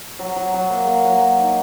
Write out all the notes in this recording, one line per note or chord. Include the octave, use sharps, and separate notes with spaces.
F#3
F#3
F#3
A#3
A#3
F#3
A#3
D#4